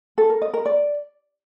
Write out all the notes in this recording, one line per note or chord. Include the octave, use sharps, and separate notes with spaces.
A4
A#4
D#5
A#4
D5